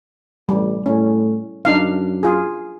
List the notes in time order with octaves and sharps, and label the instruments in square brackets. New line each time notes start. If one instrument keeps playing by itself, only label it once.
[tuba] A1 [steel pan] G3
[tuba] A2 [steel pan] C#4
[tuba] F#2 [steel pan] D4 D#4 F5
[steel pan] F4 G#4